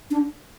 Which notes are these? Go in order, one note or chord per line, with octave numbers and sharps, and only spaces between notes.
D4